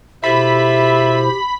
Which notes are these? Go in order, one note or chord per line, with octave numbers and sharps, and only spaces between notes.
B2 E4 F4 G4 A4 C5 E5 B5